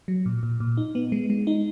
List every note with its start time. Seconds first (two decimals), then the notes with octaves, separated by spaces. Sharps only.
0.08 F#3
0.26 A#2
0.43 A#2
0.60 A#2
0.77 D#4
0.95 B3
1.12 G#3
1.30 G#3
1.47 D#4